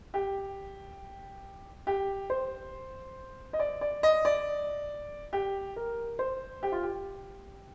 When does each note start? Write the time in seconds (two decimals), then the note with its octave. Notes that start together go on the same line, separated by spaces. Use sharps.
0.14 G4
1.87 G4
2.30 C5
3.53 D#5
3.59 D5
3.81 D5
4.03 D#5
4.25 D5
5.33 G4
5.76 A#4
6.19 C5
6.63 G4
6.72 F4
6.83 G4